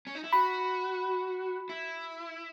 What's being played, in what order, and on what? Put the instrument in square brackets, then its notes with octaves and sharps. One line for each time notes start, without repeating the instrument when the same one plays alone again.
[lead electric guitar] C#4
D#4
E4
[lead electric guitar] F#4 [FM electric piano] B5
[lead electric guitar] E4